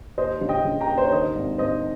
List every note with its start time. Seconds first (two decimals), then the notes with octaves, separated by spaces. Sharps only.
0.18 D#2 C5 D#5
0.41 C#3
0.49 D#5 G5
0.65 C#3
0.81 G5 A#5
0.88 D#2
0.98 C5
1.04 C#5
1.12 D#3 C5 D#5
1.35 G#1
1.58 G#1 C5 D#5